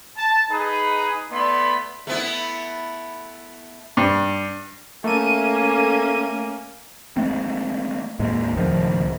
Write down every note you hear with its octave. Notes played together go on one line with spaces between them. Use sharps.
A5
D#4 G#4 B4
A3 B3 E4 D5 B5 C6
A3 B3 E4
G2
A3 A#3 C#4 D#7
G#3 A3 C4
D#2 A2 G#3
D1 C#2 D#3 F3